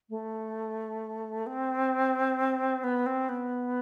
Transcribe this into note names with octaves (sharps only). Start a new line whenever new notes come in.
A3
C4
B3
C4
B3